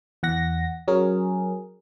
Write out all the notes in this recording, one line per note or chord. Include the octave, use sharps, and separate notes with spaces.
E2 F#5 A#6
F#3 C#4 G#4 A#4